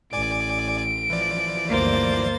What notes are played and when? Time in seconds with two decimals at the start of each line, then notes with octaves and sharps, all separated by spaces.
0.13 A1 D5 G#5 D6 D7
1.10 E3 F3 D5
1.69 G1 D2 A#3 C5 A6